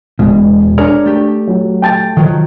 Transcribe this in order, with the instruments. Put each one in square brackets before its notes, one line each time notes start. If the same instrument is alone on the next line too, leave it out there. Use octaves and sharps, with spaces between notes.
[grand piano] E1 [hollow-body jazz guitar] B2
[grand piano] D4 [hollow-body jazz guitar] G#4 A#4 C#5
[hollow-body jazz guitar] A3 G4
[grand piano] F#3
G5 A5 A6
[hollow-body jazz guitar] D#3 F3 F#3